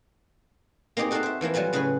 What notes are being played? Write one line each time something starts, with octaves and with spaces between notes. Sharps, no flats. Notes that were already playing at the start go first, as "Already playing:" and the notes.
A#3 C4 D#4 G4 G#4
D#4 F#4 A4 D5 F5 A5
C5 E5
E3 F3 A#3 E4
F#3 G3 F4 G#5 B5
A2 C#3 C#4 B4 G#5 B5